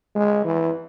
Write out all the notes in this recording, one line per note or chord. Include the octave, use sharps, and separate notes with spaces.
G#3
E3